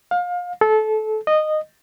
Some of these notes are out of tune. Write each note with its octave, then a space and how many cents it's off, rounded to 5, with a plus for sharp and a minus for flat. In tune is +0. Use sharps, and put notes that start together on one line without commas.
F5 +30
A4 -25
D#5 -15